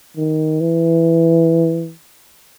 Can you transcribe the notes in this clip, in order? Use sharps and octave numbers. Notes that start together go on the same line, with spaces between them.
D#3
E3